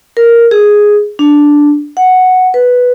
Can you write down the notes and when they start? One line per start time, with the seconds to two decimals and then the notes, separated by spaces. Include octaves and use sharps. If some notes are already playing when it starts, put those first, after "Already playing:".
0.17 A#4
0.51 G#4
1.19 D4
1.97 F#5
2.54 B4